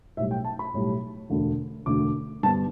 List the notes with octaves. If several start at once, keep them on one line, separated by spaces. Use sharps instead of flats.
B1 A2 G3 E5
G5
A5
B5
B1 A2 G3
E1 D2 D3 A3
E1 D2 D3 A3 D6
G2 D3 B3 A5